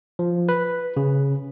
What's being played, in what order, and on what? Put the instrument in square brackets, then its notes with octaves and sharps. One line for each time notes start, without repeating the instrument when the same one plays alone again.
[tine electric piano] F3
B4
C#3